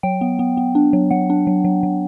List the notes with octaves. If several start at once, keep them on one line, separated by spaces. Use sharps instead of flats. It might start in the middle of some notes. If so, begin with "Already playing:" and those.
F#3 G5
B3
B3
B3
D4
F#3
F#3 F#5
D4
F#3
F#3
F#3